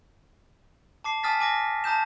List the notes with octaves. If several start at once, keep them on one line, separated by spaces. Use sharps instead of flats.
A5 D6 C7
G#5 A5 D#6 F6 A6 B6
G#5 D6 A#6
A5 A#5 D#6 G6 E7